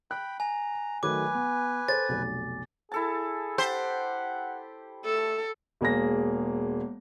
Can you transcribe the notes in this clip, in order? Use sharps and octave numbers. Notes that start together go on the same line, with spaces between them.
G5 B5 F#6
G#5 A#5
D#3 F#3 A3 B4 G#5 D6
B3
A4 C5 A6
F1 B1
E4 G#4 A4 A5
G4 C5 F#5 A5
A3 A4
E1 A#3 G#4 A#6